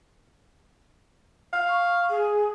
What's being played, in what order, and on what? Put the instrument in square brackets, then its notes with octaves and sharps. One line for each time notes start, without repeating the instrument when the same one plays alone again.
[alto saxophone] F5
[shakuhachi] C#6
G#4